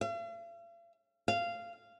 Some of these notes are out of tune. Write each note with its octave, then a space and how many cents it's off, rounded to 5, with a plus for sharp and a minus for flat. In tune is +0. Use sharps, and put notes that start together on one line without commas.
F5 -45
F5 -15